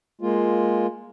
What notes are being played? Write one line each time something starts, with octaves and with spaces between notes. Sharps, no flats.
G#3 A#3 F4